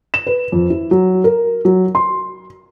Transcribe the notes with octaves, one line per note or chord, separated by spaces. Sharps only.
E7
B4
F2
E4
F#3
A#4
F#3
C6